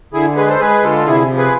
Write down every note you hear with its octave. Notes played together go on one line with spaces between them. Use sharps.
D3 E4 G#4
G#3 G#4 B4
A4 C5
G#3 G#4 B4
D3 F4 A4
C3 E4 G#4
F3
G#4 B4